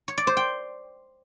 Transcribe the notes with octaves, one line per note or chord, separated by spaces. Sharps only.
C#5
D5
C5
G5